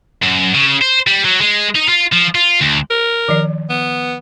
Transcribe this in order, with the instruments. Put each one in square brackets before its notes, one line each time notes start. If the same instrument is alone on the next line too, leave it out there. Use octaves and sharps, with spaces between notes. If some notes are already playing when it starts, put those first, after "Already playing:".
[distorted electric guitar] F#2
C#3
C5
G3
F#3
G#3
D#4
F4
F3
F4
D2
[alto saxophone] A#4
[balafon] D#3 F3 D5
[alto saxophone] B3